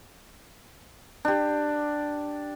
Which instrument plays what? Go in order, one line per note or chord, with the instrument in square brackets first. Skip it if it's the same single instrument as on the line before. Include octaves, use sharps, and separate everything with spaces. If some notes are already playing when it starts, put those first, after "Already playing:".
[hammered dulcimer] D4 G4